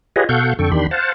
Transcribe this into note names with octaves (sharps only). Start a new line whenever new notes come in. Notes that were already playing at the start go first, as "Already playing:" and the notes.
F4 G4 G#4 B4 C#5 D#5
B2 A4 F5 F#5 C#6 G6
F2 D3 A4 G5 C#6
E2 D#3 D4 G4 B5 C6
C5 F5 F#5 A5